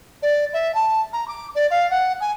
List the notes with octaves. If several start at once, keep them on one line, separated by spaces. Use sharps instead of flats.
D5
E5
A5
A#5
D6
D5
F5
F#5
G#5